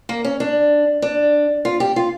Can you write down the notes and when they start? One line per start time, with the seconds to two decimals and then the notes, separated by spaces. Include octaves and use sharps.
0.09 A#3
0.24 C#4
0.40 D4
1.02 D4
1.65 F4
1.80 G4
1.96 F4